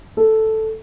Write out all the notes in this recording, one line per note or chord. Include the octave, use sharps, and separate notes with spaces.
A4